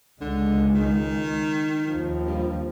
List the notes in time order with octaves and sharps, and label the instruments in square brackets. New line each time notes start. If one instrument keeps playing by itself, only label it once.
[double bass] C#2 G#3 [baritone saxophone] D3
[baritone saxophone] D#3
[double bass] D#2 F3
[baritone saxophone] G2